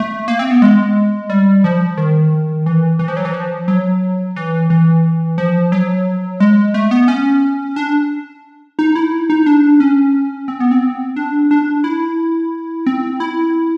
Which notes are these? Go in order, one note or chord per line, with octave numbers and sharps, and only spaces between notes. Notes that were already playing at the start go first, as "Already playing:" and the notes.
Already playing: A3
A#3
C4
B3
G#3
G3
F3
D#3
E3
E3
F3
F#3
E3
F3
F#3
E3
E3
F3
F#3
G#3
A3
B3
C#4
D4
D#4
E4
D#4
D4
C#4
C4
B3
C4
D4
D4
E4
C4
E4